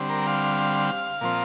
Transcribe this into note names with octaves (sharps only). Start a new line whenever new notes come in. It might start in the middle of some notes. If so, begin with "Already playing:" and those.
Already playing: D3 G3 C4
A#4
F5
A#2 F3 C4